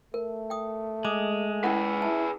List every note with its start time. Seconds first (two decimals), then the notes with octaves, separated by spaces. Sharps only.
0.14 A3 A#4
0.50 G5 D#6
1.05 G#3 D6 D#6
1.64 C#4 E4 G#4 B4 F#5
2.02 E4 A5